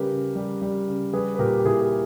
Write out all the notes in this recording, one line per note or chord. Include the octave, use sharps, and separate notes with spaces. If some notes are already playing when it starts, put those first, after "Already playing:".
Already playing: C#3 G3 G4 A#4 B4
C#3
G3
G3
C#3
G3 G#4 B4
B4
A#2 G4 A#4
G4
A#2 E4 G#4
G#4